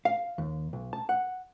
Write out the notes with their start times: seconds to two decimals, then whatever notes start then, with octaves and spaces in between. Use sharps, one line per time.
0.05 F5
0.38 D#2
0.73 B1
0.93 A5
1.09 F#5